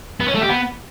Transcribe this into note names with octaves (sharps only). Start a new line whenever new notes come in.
B3
C#4
A3
G4
B3